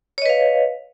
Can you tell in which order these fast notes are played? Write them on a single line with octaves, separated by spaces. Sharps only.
C#5 D#5 B4 F5